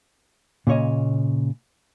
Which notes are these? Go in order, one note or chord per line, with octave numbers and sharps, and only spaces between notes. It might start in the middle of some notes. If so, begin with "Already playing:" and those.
A#2 C#3 C#5 D#5